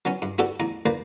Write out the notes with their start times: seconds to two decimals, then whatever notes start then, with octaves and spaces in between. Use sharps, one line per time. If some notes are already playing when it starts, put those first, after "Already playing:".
0.05 F#3 B3 C#4
0.22 G2
0.38 B3 F#4 G4 A4 D5
0.60 A1 E2 A#5
0.86 A#3 B4 C5 D5 A#5